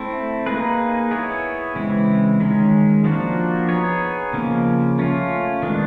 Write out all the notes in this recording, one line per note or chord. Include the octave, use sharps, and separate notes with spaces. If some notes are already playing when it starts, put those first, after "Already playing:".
Already playing: A3 C4 E4
A#3 D#4 G#4 B4
B3 E4 G#4 C#5
C#3 E3 G#3 C4 E4
D#3 G#3 C#4
F3 A#3 D4 F#4
B3 D#4 G#4 C#5
C#3 F3 A#3 C#4
A3 C#4 F4
D#3 G#3 B3 D4